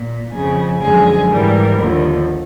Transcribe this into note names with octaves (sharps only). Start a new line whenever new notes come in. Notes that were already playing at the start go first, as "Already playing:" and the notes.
Already playing: A#2
F2 C#3 F3 G#4
F#2 D3 F3 G#3 G#4
G#2 E3 G3 A#4
D#2 D3 F3